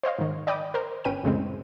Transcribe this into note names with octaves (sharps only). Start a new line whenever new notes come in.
C5 C#5 D#5 F5
G#2 D#3
D5 D#5 G5 B5 D6 D#6
A#4 C5
G1 C#4 B4 G5 D#7
C2 F#2 A2 C#3 G#3 C4